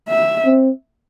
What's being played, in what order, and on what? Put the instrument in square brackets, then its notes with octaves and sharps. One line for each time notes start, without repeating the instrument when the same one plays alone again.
[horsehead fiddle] E5
[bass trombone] C4